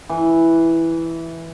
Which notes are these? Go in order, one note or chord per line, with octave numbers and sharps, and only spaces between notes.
E3